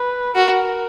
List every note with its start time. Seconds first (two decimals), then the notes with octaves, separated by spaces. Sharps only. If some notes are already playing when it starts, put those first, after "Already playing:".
Already playing: B4
0.35 F#4 A#4